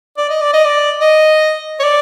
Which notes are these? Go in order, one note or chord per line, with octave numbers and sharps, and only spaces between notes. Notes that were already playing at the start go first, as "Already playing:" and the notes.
D5
D#5
D5
D#5
D5
D#5
C#5
D5